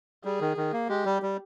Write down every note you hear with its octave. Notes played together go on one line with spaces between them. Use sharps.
G3 G#4
D#3
D#3
A#3
G#3 G4
G3
G3